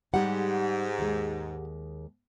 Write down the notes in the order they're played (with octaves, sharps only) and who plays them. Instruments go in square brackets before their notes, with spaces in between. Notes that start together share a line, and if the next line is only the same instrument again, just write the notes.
[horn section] G#2 [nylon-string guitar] G3 [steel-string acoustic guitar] G4 F#5
[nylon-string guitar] D#2 G#3